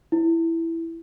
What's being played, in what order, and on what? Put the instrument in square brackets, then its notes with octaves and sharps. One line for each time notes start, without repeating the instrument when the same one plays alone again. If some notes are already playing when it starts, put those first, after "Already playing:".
[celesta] E4